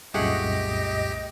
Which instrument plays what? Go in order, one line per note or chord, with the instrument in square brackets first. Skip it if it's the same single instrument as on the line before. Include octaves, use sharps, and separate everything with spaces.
[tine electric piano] C2 F#2 A#2 [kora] A3 G#4 F#5 [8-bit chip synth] G4 [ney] D#5